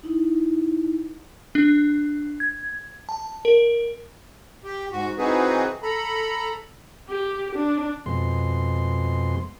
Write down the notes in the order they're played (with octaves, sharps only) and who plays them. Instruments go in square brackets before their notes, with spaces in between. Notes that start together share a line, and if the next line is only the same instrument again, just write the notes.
[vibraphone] D#4 E4
[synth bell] D4
G#6
A5
A#4
[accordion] G4
G#2 F#4
E3 C4 D#4 F#4 G#4 B4
A4 A#5 B5
[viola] G4
D4
[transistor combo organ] F2 B2 G#3 C6